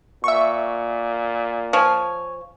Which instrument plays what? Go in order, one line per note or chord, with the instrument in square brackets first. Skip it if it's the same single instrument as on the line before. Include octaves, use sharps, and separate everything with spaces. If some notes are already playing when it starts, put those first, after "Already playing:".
[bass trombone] A#2 [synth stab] E5 C#6
[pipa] F3 [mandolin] C#5 G#5